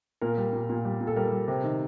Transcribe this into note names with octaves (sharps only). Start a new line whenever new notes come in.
A#2 A#4
G3
A#2
A#2
G3
A#2
A4
G3 A#4
G3
C3
D#3